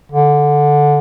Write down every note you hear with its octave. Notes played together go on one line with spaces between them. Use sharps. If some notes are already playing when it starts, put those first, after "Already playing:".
D3